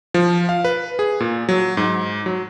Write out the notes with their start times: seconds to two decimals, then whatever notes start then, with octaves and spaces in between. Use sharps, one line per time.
0.14 F3
0.49 F5
0.65 B4
0.99 G#4
1.20 A#2
1.49 F#3
1.77 G#2
2.26 F#3